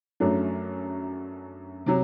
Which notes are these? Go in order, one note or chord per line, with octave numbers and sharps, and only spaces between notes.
F#2 F#3 A3 D4
C3 F#3